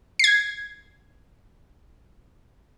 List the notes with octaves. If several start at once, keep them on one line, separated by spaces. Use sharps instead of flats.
G#6 C7